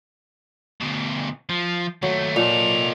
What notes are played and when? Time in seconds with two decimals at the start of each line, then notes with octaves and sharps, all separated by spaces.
0.81 D2 B2
1.49 F3
2.03 D#2 F#3 A3
2.36 A#2 D#4 A4 F7